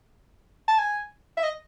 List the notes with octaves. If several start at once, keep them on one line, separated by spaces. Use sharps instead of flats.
A5
G#5
E5
D#5